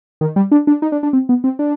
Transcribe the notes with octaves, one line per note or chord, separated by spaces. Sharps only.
D#3
G3
D4
D4
D#4
D4
D4
C4
B3
C4
D4